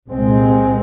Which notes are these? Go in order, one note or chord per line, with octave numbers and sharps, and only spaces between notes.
C2 A#2 G#3 C4